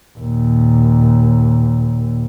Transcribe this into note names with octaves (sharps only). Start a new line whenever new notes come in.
D#2 A#2